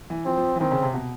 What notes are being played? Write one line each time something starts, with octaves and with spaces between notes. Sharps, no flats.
E3
F3 C4
F3
E3
D#3 C4
C#3
C3
B2